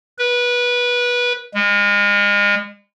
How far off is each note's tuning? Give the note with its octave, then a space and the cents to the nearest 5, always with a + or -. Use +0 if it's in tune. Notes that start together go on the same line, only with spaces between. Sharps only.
B4 -20
G#3 -35